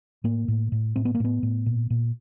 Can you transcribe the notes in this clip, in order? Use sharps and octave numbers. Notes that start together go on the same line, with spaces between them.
A2 A#3
A2
A2
A2 C4
B3
A#3
A2 B3
A2
A#2
A#2